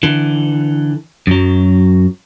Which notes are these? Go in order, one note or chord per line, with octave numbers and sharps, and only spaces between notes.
D3 E3
F#2 F#3